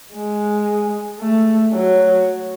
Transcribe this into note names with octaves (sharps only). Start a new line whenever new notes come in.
G#3
A3
F#3